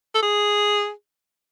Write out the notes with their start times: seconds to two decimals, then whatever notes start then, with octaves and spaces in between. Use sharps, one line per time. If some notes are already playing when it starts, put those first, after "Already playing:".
0.14 A4
0.22 G#4